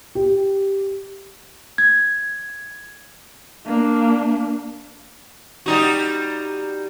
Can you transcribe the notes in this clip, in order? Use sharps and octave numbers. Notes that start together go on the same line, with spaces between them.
G4
G#6
A#3 D4
G3 D#4 F#4